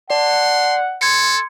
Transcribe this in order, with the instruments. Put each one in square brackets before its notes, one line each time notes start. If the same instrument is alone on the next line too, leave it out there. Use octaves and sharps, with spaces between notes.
[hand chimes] D5 [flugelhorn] F#5 [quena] A5 [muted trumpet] C6
[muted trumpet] A4 [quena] C6 [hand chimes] G#6 C#7